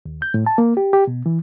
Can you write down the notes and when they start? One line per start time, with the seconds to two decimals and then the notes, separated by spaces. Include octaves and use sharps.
0.06 D#2
0.22 G6
0.34 A2
0.46 A5
0.58 A#3
0.77 G4
0.93 G4
1.07 B2
1.26 E3